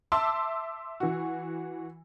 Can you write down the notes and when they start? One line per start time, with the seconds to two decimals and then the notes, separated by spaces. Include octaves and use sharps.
0.12 E5 A5 C6 D6 E6
1.00 E3 F#4